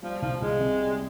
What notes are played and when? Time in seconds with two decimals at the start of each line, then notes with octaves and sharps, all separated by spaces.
0.03 F3 G3
0.22 C2 F3
0.40 C2 G#3
0.60 C3
0.80 G3